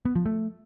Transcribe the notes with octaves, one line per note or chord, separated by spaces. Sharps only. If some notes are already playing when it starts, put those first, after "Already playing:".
B3
F3
A3